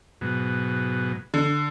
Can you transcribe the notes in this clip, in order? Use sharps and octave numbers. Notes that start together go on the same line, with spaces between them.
G#2 B2 F#3
D3